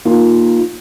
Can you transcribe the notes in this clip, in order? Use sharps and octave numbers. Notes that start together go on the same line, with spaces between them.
A#3 D#4 F4